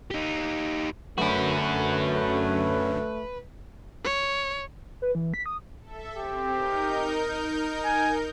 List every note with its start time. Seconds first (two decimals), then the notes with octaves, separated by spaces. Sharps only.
0.11 D#4 G4
1.18 F#2 D3 A3 C#4 F#4 B4
4.04 C#5
5.02 B4
5.15 E3
5.34 B6
5.46 D#6
5.81 A4 E5
6.16 C4 G4
6.53 D#4 A#4 G6
7.84 G#5